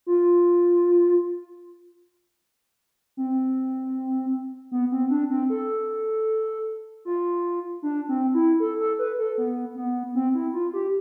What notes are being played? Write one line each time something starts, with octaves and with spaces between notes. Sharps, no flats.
F4
C4
B3
C4
D4
C4
A4
F4
D4
C4
E4
A4
A4
B4
A4
B3
B3
C4
E4
F4
G4